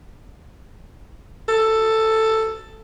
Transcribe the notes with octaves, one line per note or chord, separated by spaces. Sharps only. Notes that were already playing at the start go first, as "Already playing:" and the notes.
A4